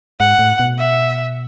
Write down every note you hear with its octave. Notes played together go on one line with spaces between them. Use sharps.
G#2 F#5
A2
B2
E5